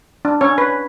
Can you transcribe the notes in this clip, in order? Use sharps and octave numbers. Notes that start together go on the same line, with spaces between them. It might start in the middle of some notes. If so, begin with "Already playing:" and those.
D4
C#4 C#5
B4